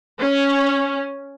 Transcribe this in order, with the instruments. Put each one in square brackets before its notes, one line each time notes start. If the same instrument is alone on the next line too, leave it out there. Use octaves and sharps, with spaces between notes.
[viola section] C#4